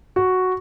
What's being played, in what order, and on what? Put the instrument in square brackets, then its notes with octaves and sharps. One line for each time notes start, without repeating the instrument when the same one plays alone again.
[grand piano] F#4